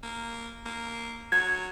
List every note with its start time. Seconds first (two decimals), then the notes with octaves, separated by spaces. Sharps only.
0.03 A#3
0.66 A#3
1.32 F#3 G#6